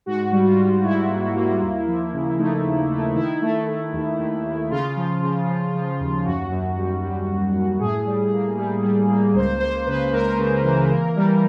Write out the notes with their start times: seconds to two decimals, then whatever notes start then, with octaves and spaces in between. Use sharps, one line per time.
0.06 G#2 F#4
0.32 G3
0.45 F4
0.58 G3
0.83 G#2 E4
1.09 A#3
1.36 A#3
1.61 D#2
1.87 F3
2.13 C#3
2.39 A3 D#4
2.64 D#2
2.91 A3
3.15 D#3 E4
3.42 A3
3.67 A3
3.93 D#2
4.19 D#2
4.45 D#2
4.70 C#3 F4
4.96 F3
5.22 C#3
5.48 F3
5.74 F3
6.00 D#2
6.25 F#2 F#4
6.52 F#2
6.78 G3
7.03 G3
7.29 F#2
7.54 F#2
7.79 A2 G#4
8.06 G3
8.32 A#3
8.58 G3
8.83 G3
9.09 A#3
9.34 C#2 C5
9.60 C#2 C5
9.86 C#3 B4
10.13 C#2 A#4
10.38 C#3
10.63 E3
10.89 A#3
11.16 G3